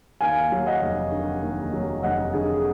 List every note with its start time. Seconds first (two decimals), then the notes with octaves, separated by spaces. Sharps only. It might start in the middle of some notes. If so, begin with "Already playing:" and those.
0.21 D#2 F5 G#5
0.52 F#3
0.66 D#5 F#5
0.82 F1
1.12 D3
1.42 D#2
1.73 F#3
2.03 F1 D#5 F#5
2.33 D3 G#4